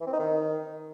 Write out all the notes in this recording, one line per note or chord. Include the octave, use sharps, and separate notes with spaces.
E3
C4
D#4
D#3